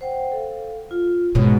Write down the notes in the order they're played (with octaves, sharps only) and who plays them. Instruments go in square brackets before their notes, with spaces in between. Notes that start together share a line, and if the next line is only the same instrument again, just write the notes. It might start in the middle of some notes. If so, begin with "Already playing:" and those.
[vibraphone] C5 F#5 G5
A4 F5
F4
[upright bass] G#2 B2 [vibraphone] C#5 D#6